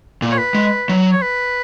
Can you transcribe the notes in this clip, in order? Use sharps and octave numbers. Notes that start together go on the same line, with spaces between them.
A#2
C#5
B4
G#3
F#3
C#5
B4